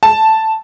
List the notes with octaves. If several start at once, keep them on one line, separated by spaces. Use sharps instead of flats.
A5